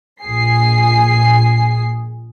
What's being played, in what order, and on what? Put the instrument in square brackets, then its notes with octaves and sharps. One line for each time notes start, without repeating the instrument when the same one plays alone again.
[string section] A#1 G#4 C7